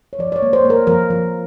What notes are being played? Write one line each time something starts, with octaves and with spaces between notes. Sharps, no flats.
C#5
F3 D5
D5
C#5
A#3
C5
A#3
A#4
F3 A#4
F3